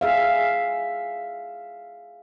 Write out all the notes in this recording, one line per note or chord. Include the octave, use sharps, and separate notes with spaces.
G#4 E5 F5